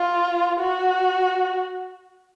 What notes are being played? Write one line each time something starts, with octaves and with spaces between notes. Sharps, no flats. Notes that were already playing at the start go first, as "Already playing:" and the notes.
Already playing: F4
F#4